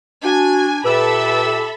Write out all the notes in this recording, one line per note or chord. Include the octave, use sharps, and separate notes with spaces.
D4 F#4 G#5
A#2 G4 A4 B4 E5 B5 E6